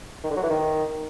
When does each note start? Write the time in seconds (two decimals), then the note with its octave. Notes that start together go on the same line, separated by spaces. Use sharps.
0.24 D#3
0.31 D3
0.37 F#3
0.43 E3
0.50 D#3